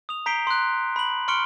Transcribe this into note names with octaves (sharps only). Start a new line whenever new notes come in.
D#6 F7
A#5 G6 B6 C7 D7 G7
C6 F#6
B5 F#7
C6 C#6 F6 C#7 D7 G7